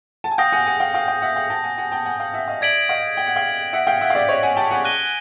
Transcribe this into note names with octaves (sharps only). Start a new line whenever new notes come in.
A5
G#5
F5 G5 D#6 G6 A#6
F#5 G#5
F#5 G#5
F5 G5
F5 G5
F5 G5
E5 F#5
F5 G5
G5 A5
F#5 G#5
F#5 G#5
G5 A5
F#5 G#5
F5 G5
E5 F#5
D#5 F5
D5 E5 G#6 B6 D7 F#7
D#5 F5
G5
F#5
F5 G5
E5 F#5
F5 G5
E5 F#5
F5
D5 E5
C#5 D#5
F#5 G#5
G5 A5
F#5 G#5
F#6 A#6 D#7 G7